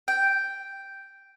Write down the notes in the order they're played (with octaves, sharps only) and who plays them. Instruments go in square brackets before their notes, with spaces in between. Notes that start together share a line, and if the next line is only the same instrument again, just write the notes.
[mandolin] G5